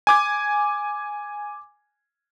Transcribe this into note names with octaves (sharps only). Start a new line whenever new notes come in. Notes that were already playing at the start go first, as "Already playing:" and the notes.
G#5 D6 G#6